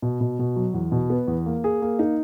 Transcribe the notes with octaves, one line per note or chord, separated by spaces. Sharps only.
B2
B2
B2
F#3
E2
B2
B3
E2
A#3
G#4
A#3
D#4